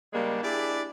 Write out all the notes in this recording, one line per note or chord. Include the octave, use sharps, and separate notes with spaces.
C#3 G3 G#3 A#3 D4
D4 E4 G4 G#4 D5